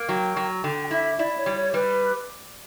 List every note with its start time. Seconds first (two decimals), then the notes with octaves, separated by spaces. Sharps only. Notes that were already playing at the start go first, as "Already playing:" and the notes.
Already playing: A#3
0.09 F#3 G5
0.36 F#3
0.64 D3 G5
0.91 E4 E5
1.19 E4 D5
1.38 C#5
1.46 G3
1.56 C#5
1.74 G3 B4